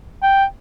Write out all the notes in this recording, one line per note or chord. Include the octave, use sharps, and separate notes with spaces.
G5